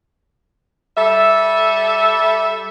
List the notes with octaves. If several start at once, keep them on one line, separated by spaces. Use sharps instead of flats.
G3 A4 E5